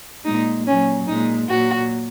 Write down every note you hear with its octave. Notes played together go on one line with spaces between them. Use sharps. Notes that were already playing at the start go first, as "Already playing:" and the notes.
A#2 G#3 D#4
A#2 F#3 C#4
A#2 G#3 D#4
A#2 F#3 F#4